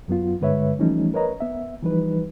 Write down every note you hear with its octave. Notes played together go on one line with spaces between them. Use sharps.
F#2 F#3 B3 F4
G2 D3 G#3 B4 C#5 E5
E3 F3 G3 A3 C#4 D#4
A#4 B4 C#5 D#5 A#5
B3 E5
E3 F3 G3 D#4 B4